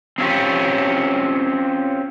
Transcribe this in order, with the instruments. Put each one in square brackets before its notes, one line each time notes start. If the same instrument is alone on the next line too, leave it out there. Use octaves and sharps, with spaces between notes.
[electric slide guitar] C4 C#4 F4 G4 C#5